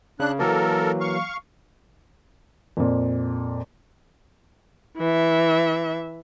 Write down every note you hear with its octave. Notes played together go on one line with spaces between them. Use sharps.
C#3 D4 F#6
E3 F#3 A#3 A4 A#4
F5 C#6
F2 A#2
E3 E5